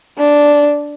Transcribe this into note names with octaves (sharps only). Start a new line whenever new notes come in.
D4